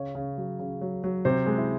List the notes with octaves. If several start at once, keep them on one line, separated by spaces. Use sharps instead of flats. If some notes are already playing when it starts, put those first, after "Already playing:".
Already playing: C#3 C#5
C#3
F#3
C#3
F#3
F#3
C3 C5
G#3
E4